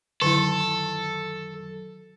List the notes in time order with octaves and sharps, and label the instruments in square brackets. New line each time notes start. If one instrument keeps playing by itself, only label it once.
[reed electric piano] F#2 D#3 F#3 [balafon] D3 E4 [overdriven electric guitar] A4